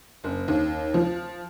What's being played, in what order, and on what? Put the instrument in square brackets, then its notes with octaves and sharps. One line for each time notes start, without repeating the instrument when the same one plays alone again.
[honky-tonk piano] F#1
D#2
F3